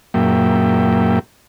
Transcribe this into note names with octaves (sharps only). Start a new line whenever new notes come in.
F#2 A#2 F#3 A#3 E5 G5